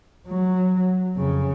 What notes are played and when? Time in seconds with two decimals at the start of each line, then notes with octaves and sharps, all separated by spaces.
0.28 F#3
1.16 F2 C#3